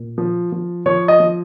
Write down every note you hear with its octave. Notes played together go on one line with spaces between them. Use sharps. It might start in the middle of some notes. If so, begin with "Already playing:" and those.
Already playing: A#2
F3
F3
F3 C#5
D#5
F3